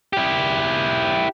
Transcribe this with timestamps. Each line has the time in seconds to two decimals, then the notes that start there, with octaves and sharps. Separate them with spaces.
0.13 E4 G4